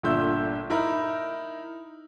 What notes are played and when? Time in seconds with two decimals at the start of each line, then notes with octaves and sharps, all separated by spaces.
0.03 G1 A#2 D3 E5 E6 G6
0.70 D#4 E4 A#4 B5